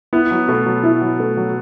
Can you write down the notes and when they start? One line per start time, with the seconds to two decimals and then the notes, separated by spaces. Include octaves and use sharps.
0.13 B3 E4
0.31 F#3
0.48 B2 A3
0.66 F#3
0.84 E4
1.01 F#3
1.20 A3
1.37 F#3